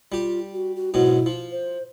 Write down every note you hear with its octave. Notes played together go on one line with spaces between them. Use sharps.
G3 F4 G4
F#4
F#4
G#2 B2 F#3 E4
F3
C5